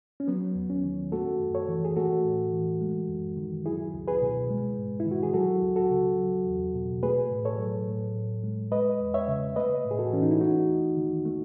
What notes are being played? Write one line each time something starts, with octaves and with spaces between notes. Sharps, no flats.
C#4
F#3 B3
D#2
C#4
D#3
A3 F#4 A4
F#2
A4 C#5
E3
G#4
A3 F#4 A4
A2
E3
G#3
F#2
D#3
F#3 E4 G#4
C#2
G#4 B4
B2
G#3
G#2
E4
D#3
F#4
G#4
F#3 F#4 A4
C#2
F#4 A4
C#3
F#3
E2
B2
A3 G#4 B4
A2
A4 C#5
F#3
A2
A2
G#3
G#3 B4 D#5
E2
C#5 E5
C#3
A3 B4 D#5
A2
G#4
F#4 A4
E3 C#4
D#4
E4
A3 D#4 F#4
D#2
D#3
A3